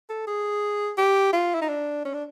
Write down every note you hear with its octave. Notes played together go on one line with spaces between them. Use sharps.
A4
G#4
G4
F4
E4
D#4
D4
C#4
D4